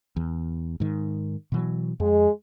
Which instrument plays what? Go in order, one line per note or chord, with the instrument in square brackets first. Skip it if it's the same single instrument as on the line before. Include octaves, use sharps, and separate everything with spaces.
[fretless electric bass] E2
G#2 D#3
B2 E3 F#3
[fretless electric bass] F2 [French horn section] G#3